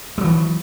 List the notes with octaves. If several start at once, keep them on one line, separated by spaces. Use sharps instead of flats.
E3 F#3 G#3